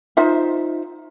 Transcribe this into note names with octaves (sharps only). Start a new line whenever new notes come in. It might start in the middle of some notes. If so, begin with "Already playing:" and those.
D#4 F4 C5 E5